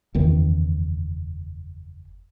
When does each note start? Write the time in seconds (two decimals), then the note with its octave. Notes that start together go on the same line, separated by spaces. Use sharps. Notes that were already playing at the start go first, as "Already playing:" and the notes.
0.15 F#1 E2 D#3 E3